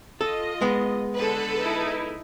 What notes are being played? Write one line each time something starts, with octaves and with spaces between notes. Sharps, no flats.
F4 A4 D#5
G#3 B3
D3 G#4 A4 B4
D#4 E4